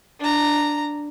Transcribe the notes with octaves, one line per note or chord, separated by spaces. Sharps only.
D4 A#5